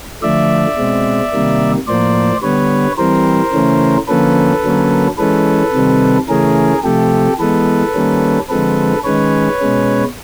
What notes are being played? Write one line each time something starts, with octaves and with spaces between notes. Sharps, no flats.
D3 F3 A3 D5 E5
B2 G#3 C4
C3 D#3 G3 A#3
A2 F3 A#3 C5 D5
D3 G3 B3 B4 C#5
E3 G3 C4 A#4 C5
C#3 E3 A3 C#4
D3 F3 A#3 C#4 A4 B4
D3 F#3 A#3 C#4
E3 G#3 C#4 A4 B4
C3 D#3 G3 C4
C#3 E3 A3 C#4 G#4 A#4
C3 F3 A3 G4 A4
E3 G#3 B3 A4 B4
D#3 G3 A#3 C#4
D3 F3 G#3 C4 A4 B4
D#3 G#3 C#4 B4 C#5
B2 G#3 C#4